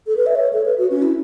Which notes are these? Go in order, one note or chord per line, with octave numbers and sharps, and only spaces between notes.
A4
B4
E5
C#5
A4
B4
F#4
C#4
E4